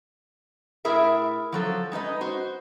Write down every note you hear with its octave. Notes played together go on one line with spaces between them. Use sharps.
A2 E4 G#4 A#4 E5
F3 F#3 A4
G#3 D#4 B4 D#5
F#4 C5